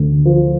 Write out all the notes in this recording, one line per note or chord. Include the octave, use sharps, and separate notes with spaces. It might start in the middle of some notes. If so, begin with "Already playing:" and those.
Already playing: D2
F3